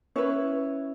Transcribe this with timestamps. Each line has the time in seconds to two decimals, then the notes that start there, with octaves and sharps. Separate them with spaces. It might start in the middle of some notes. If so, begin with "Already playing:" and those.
0.16 C#4 E4 B4 C#5